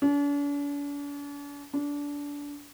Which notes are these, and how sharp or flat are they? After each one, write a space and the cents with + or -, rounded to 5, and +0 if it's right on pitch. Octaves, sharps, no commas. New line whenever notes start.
D4 -45
D4 -25